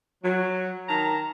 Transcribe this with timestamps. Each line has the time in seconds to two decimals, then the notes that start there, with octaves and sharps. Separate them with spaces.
0.24 F#3
0.88 D#3 A5 A#5